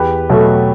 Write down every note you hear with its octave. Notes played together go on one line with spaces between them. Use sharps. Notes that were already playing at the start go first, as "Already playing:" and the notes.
Already playing: E2 G4 B4
B2 F#3 A3